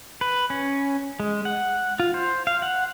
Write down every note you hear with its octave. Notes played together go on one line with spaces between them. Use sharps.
B4
C#4
G#3
F#5
F4
C5
F5
F#5